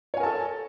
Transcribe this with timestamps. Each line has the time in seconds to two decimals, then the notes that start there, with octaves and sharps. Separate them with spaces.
0.14 C#5
0.17 G#5
0.20 A#4
0.23 A5
0.26 A4